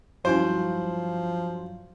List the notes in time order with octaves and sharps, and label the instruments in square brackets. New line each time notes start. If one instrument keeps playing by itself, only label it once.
[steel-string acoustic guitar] G2 F#3 [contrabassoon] F3 [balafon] C#4 E4 F#4 [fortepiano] C5